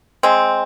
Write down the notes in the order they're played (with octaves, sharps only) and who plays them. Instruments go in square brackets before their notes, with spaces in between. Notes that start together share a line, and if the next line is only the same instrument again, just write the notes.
[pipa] G#3 C4